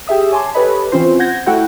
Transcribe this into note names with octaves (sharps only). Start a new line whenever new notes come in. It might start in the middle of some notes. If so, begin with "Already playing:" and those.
G4 G#4 E5 D#6
C#5 G#5 A5 C6 D6
G4 A4 B4 C#5 D#5 B5
E3 C4 C#4 F4 C5
F#5 G6 G#6 A#6
A3 E4 F#4 F#5 G5